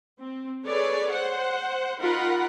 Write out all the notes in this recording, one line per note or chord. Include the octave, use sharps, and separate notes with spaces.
C4
G#4 A4 B4 C#5 D5
C5 F#5
D#4 F4 A#4 F#5 B5